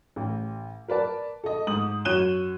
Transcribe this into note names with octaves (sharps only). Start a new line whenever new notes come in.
A1
A#4 B4 D5 A5
A4 D#5
G#2 D#6 F#7
F#2 C#5 F#6 D#7 E7 G7